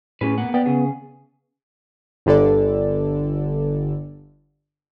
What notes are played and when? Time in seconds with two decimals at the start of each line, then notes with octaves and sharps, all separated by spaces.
0.21 A2 C#4 G#4 B4
0.38 A#3 B3 F#5
0.54 B3 B4 D5 G5
0.66 C#3 G#4
2.26 G1 D3 A4 D5